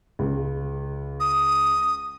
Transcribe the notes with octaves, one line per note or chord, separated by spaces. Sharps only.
C#2
D#6